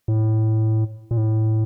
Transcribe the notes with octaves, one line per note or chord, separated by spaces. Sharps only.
A2
A#2
A2